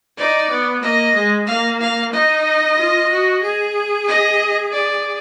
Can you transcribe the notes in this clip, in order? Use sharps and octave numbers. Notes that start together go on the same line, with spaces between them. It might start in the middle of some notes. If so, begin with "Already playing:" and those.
D#4 D5
B3
A#3 D#5
G#3
A#3 F5
F5
D#4 D#5
F4
F#4
G#4
D#5
D5